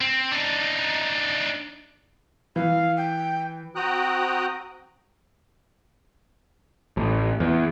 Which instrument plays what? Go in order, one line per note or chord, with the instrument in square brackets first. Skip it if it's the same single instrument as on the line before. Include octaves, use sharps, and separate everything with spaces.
[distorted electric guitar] C4
D4 D#4
[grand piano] E3 [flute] F5
[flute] G5
[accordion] C4 F#4 G5 A#5 D#6 F#6
[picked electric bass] A1
E2